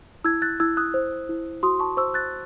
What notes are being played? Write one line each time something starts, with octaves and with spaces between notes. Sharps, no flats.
E4 E6 G#6
F#6 A6
E4 E6 G#6
D#6 F#6
C5
E4
F#4 C6 D#6
A5 C#6
C5 C#6 E6
F#6 A6